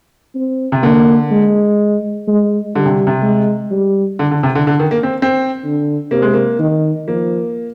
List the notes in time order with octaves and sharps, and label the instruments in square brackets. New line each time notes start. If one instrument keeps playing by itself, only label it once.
[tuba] C4
[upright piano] C3
[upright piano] D3 [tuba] A#3
[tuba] G#3
G#3
[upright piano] D3 [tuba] G3
[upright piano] C3
C3
[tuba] G#3
G3
[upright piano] D3
D3
C3
D3
D3
D#3
A#3
C4
C4
[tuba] D3
[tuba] C3 [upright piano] A#3
[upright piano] G#3
A#3
[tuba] D#3
[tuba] F3 [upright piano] A#3